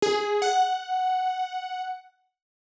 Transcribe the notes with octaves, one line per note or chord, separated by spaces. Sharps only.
G#4
F#5